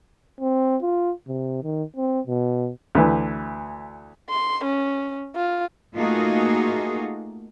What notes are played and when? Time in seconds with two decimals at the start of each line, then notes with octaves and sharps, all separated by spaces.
0.40 C4
0.82 F4
1.27 C3
1.63 D#3
1.96 C4
2.27 B2
2.95 D2 E3
4.29 C6
4.64 C#4
5.36 F4
5.94 A3 A#3 D#4 F4 F#4 G#4